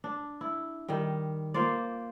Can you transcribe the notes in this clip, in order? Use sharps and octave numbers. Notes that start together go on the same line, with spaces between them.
D4
E4
D#3 G3
A#3 F4 C5 D5